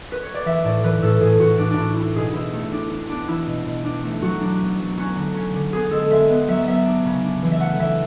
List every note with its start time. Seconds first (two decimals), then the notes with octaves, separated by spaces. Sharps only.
0.12 B4
0.23 C#5
0.34 D5
0.45 E3 E5
0.64 A2 D5
0.83 E3 B4
1.02 A2 A4
1.21 A2 G#4
1.40 A2 F#4
1.58 A2 D4
1.71 D4
1.77 A2 E4
1.96 D4 E4
2.15 B2 G#4
2.34 B2 E4
2.53 A3
2.72 D4
2.91 D4
3.08 B3 D4
3.28 E3 E4
3.46 B2
3.66 B2
3.84 D4
4.03 A3
4.22 F#3 F#4
4.40 D4
4.60 B3
4.79 F#3
4.97 C#4 F#4
5.16 D3
5.35 C#4
5.54 D3
5.73 B3 G#4
5.91 G#3 A4
6.10 G#3 E5
6.29 B3
6.48 F#3 E5
6.67 B3 E5
6.86 D4
7.05 C#3
7.23 D4
7.42 E3
7.51 E5
7.60 A3 F#5
7.79 E3 E5